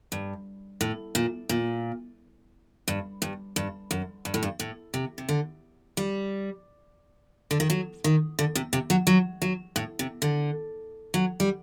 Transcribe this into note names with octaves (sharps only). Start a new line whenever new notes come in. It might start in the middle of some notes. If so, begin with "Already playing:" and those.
G2
A2
A#2
A#2
G2
G2
G2
F#2
G2
A2
G2
A2
C3
C3
D3
G3
D3
D#3
F#3
D#3
D3
C3
C3
F#3
F#3
F#3
A2
C3
D3
F#3
G3